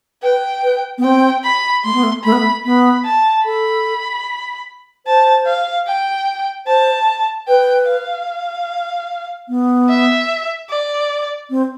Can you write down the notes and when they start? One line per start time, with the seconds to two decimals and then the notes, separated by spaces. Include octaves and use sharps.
0.23 B4 G5
0.63 B4
0.98 B3
1.03 C4 G5
1.44 B5
1.84 A3 C6
1.93 B3
2.03 A3
2.24 A3 B5
2.32 B3
2.40 A3
2.65 B3 B5
3.05 A5
3.45 A4 B5
5.06 C5 A5
5.46 F5
5.87 G5
6.67 C5 A5
7.48 B4 G5
7.87 F5
9.49 B3
9.90 E5
10.70 D5
11.50 C4